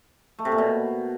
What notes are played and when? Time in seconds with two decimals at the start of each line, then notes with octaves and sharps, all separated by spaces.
0.39 A3
0.45 C3
0.52 A#2
0.58 B2